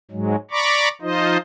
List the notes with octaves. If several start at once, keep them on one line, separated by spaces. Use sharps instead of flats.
G#2 F#3 G#3
D5 A#5 B5 C#6 D6
F3 D#4 F4 C5 D#5